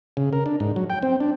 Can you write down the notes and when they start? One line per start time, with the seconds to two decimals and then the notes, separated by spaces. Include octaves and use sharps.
0.17 C#3
0.33 A#4
0.46 D4
0.60 G#2
0.76 F#3
0.90 G5
1.03 C4
1.20 D4